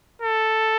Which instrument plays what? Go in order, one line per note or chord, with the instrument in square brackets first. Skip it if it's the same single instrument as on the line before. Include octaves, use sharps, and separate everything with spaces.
[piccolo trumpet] A4